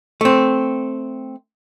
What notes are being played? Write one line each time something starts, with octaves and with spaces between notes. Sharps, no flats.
A3 C4